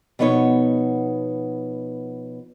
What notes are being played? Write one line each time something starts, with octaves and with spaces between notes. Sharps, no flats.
B2 F3 B3 D#4 C#5